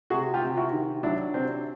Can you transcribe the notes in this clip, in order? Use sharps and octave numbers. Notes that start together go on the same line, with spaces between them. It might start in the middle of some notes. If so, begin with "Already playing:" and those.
C3 F#4 G#4
F4 G4
C3
E4 F#4
D#3
F#3 D4 E4
C3 C4 D4